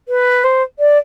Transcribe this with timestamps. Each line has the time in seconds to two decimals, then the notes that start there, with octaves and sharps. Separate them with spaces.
0.08 B4
0.44 C5
0.79 D5